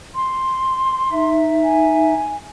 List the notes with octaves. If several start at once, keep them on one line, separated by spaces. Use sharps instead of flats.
C6
D#4 E5
G#5